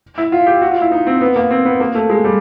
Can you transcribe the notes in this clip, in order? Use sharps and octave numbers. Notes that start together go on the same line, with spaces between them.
E4
F4
G4
F#4
F4
E4
D#4
C4
B3
A#3
C4
B3
A#3
A3
G#3
G3